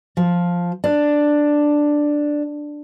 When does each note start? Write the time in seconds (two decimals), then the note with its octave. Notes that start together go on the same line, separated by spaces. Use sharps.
0.17 F3
0.84 D4